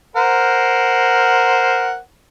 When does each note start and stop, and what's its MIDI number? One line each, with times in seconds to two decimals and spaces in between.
0.16 1.98 70
0.16 1.98 72
0.16 1.98 78